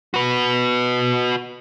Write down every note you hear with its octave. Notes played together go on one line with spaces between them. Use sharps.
F#4 B4